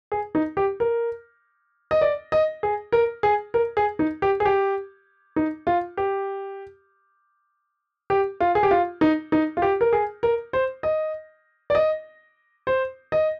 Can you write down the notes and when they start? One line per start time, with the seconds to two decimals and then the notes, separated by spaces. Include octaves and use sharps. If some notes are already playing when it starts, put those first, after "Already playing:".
0.12 G#4
0.35 D#4
0.57 G4
0.80 A#4
1.91 D#5
2.01 D5
2.32 D#5
2.63 G#4
2.92 A#4
3.23 G#4
3.54 A#4
3.77 G#4
3.99 D#4
4.22 G4
4.40 G#4
4.45 G4
5.36 D#4
5.67 F4
5.97 G4
8.10 G4
8.40 F4
8.55 G#4
8.63 G4
8.71 F4
9.01 D#4
9.32 D#4
9.57 F4
9.62 G4
9.81 A#4
9.93 G#4
10.23 A#4
10.53 C5
10.83 D#5
11.70 D5
11.75 D#5
12.67 C5
13.12 D#5